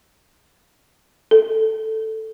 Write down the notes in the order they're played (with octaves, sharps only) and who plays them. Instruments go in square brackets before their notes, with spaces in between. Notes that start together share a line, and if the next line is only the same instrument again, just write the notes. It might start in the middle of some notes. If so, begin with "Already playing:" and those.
[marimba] A4